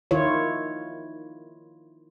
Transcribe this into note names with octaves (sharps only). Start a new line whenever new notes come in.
D#3 E4 F4 C#5